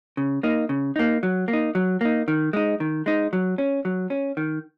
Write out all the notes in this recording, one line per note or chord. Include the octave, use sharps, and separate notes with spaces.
C#3
A#3 D#4
C#3
A#3 D#4
F#3
A#3
D#4
F#3
A#3 D#4
D#3
G#3 D#4
D#3
G#3 D#4
F#3
C#4
F#3
C#4
D#3